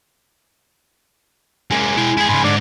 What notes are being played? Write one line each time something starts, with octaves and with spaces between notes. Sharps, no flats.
G#3 A#3 C#4
E4 G5
E4 G#4
G#2 C#3 G#5 B5 C6
G#2 D3 D4